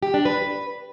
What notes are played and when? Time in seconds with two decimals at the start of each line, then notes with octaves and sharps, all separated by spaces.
0.03 G4
0.14 D4
0.25 B4